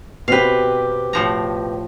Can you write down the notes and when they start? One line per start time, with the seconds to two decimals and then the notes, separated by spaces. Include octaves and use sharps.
0.28 B2 C4 G4 B4 F5
1.13 A2 F3 A#5